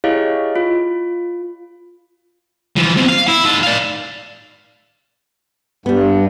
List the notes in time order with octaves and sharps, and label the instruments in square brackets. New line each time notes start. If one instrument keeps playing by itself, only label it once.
[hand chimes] E4 G4 G#4 C#5 D#5 F5
F4
[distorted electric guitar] E3 F3
B2 C4
F5
E4
D#3 A5
D5 F5
[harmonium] G2 [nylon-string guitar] G3 B3